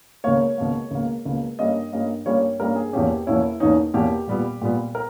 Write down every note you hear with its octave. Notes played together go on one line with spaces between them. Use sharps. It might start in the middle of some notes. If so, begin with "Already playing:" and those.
C#2 B2 A#3 C#5
C#2 B2 A#3
C#2 B2 A#3
C#2 B2 A#3
G2 G3 A#3 C#4 D#5
G2 G3 A#3 C#4
G2 G3 A#3 C#4 C#5
G2 G3 A#3 C#4 A#4
G#4
E2 B2 A#3 C#4 G4
E2 B2 A#3 C#4 E4
E2 B2 A#3 C#4 D#4
E2 B2 A#3 C#4 G4
A#2 G3 B3
A#2 G3 B3
A#4